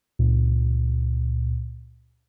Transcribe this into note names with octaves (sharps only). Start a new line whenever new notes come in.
C#2 A#2